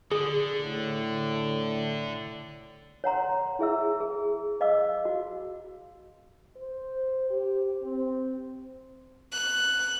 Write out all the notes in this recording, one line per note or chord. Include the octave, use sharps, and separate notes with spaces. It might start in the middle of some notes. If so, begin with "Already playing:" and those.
D3 G#4
A2
C#5 F#5 A#5 C6
E4 G#4 E5 E6
G#4
C5 D#5 F5 D6 E6
F#4
C5
G4
C4
F#6